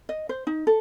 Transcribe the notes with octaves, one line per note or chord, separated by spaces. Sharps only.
D#5
C5
D#4
A4